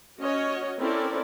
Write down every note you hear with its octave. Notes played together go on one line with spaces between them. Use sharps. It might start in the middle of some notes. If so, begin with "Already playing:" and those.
C#4 F#4 C#5 D#5
C4 C#4 E4 A4 A#4 D5